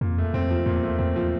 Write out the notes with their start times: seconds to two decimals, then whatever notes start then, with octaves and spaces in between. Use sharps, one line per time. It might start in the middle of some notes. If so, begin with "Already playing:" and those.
0.01 F2 A#2
0.18 A3
0.34 F2 C4
0.51 F3
0.66 E2 A#2
0.83 A3
0.99 E2 C4
1.16 F3